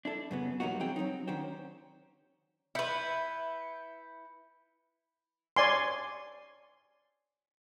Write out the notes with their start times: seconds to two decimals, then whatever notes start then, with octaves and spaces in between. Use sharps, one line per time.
0.05 D4 E4 A4
0.31 F#2 C#3 B3
0.60 E3 F#3 G3 A#3 D#4 F#4
0.80 C4 E4 G#4 F#5 G5
0.96 F#3 A#3 C4 D#4
1.27 D#3 C#4 D4 F#4 C5 G5
2.75 E4 B4 E5 G6 C#7
5.56 C#5 D5 G#5 C6